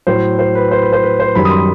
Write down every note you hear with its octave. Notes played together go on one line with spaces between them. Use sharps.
A2 F#3 C5
C5
B4
C5
B4
C5
B4
C5
F#2 D#3 G3 B5
D#6
C6